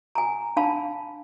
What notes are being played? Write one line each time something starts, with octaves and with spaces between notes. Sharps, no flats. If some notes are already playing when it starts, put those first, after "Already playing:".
G#5 A#5
D4 F5 A5 B5